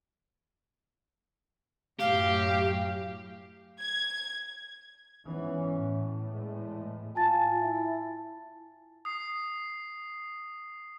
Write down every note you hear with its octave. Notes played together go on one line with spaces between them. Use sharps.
F#2 A2 G4 F5
G#6
G#2 E3 B3 C#4
A2
E2 E3 G#3
F4 G#5 A5 A6
E4
D#6 C7